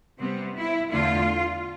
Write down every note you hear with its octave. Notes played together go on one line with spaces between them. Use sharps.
C3 G3 B3 C4
E4
E2 D3 A3 F4